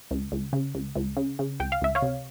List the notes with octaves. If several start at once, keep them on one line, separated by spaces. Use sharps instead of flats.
C#2
C#2
C#3
C#2
C#2
C#3
C#3
C#2 G5
F5
C#2 E5
C#5 F5
C3